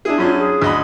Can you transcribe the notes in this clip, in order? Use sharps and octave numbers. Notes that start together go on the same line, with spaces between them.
D4 E4 G#4
F#2 C#4 D4 F4
G#4
D2 D#5 B5